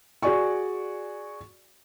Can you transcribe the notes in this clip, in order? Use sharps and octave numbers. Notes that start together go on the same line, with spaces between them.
F#4 G#4 D5 G#5 C#6